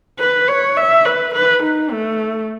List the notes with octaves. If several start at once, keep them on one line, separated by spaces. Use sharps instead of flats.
B4
C#5
E5
B4
B4
D#4
A3